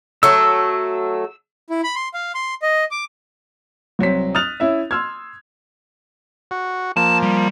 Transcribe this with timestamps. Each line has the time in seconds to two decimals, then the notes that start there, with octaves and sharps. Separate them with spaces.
0.23 F#3 A3 E6
1.70 E4
1.83 B5
1.95 C6
2.14 F5
2.35 C6
2.62 D#5
2.91 D6
3.99 C2 F#3 C4 B6
4.35 D#6 F6 F#6 A6 F7
4.60 C#4 E4 E5
4.91 C6 E6 F6 G#6
6.51 F#4
6.97 F3 A#3 A5
7.23 G3